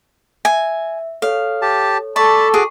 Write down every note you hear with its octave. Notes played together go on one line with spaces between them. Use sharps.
E5 G#5
A4 C#5 F5
G4 A5
A4 D5 A5 B5 C#6
F#4 G#4 D6